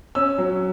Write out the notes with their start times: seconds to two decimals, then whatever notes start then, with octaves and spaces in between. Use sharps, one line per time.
0.15 C#4 E6
0.38 F#3